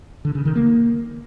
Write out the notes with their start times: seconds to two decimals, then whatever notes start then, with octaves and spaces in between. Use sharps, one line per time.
0.25 D3
0.35 C#3
0.45 D#3
0.56 A#3